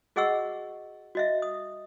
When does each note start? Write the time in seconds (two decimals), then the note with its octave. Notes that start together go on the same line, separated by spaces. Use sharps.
0.16 F#4 G#4 D#5 F#5 C#6 E6
1.15 F#4 D#5 E5
1.42 D#6